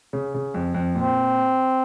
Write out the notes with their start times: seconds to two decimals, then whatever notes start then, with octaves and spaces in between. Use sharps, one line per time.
0.13 C#3
0.34 C#3
0.54 F2
0.74 F2
0.95 A#2 C4